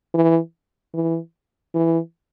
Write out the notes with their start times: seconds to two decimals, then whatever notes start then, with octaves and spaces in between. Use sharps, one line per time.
0.14 E3
0.94 E3
1.74 E3